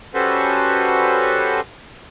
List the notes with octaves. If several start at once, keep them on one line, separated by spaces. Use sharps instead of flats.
G3 C#4 F#4 A4 B4 C5